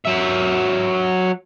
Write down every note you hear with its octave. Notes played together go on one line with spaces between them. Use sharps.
F#3 E5